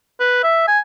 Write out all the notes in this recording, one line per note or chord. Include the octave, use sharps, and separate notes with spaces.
B4
E5
G#5